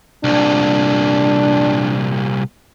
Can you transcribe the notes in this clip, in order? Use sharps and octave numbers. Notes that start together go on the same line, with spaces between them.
C2 A#2 D4